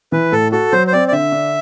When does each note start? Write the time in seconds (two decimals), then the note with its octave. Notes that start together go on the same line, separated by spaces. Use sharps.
0.12 E3 B4
0.32 A2 A4
0.52 F#4 A4
0.72 F#3 C5
0.87 C5
0.92 C4 D5
1.08 D5
1.12 D3 E5
1.32 D4